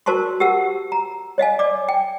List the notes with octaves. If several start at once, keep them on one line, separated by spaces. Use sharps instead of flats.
F#4 A#4 C5 A5 C6 C#6
G4 A#4 F#5 E6
A#5
C#5 D#5 F5 G#5
D5 D6
G5